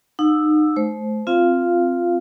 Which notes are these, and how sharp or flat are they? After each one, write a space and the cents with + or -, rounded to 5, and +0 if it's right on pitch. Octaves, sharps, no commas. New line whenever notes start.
D#4 -30 F#5 -40 E6 +0
A3 -35 C5 +0
C4 +0 F4 +0 F5 -15